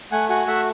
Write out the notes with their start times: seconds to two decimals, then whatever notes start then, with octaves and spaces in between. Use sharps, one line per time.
0.11 A3 F#5 G#5
0.29 F#4 F#5 G#5
0.47 A3 E5 F#5